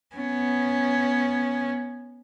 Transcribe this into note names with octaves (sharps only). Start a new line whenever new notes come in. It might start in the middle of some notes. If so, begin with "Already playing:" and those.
B3 C#4